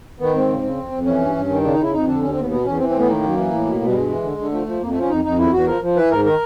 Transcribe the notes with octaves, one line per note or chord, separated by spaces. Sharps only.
D#3 B3
G#2 C4
C#3
C#3
F2
F2
E3 C#4
G2
G2
D#3
C#3 D4
D#4
C#3 E4
F2 D#4
D3 D4
D#2 C#4
C4
D#2 B3
B2 B3
E2 C#4
E3 C4
C4
A2
B3
D#3 A#3
F#2
E3
A2
B2
B2
G3
G2 G#3
E3
D3
D3
F3 A3
F3
F2 A#3
A3
F3
C#4
F2 D#4
F2 D#4
E2 E4
E2 F#4
F3 A#4
F3
E3 B4
G#2 A#4
D#3 A#4